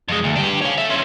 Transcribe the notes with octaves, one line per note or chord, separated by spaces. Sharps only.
F2 G#3
D2
D4 G4
C#5 F5
A4 E5
C4 C#4